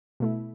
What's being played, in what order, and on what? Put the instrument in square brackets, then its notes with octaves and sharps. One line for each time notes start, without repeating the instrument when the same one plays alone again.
[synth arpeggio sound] B2 A3 E4